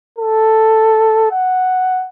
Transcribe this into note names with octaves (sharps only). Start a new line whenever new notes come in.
A4
F#5